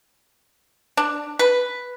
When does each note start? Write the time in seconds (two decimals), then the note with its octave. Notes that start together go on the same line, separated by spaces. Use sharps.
0.97 D4
1.39 B4